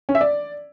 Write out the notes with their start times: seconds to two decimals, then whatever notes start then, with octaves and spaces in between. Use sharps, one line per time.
0.09 C#4
0.15 E5
0.21 D5